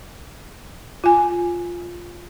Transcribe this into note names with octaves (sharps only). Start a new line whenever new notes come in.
F4 G#5